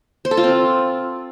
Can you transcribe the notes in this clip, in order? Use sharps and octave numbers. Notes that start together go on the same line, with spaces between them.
C5
A4
F4
C4